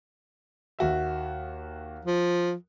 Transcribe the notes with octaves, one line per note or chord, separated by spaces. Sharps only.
D#2 F#4 E5
F3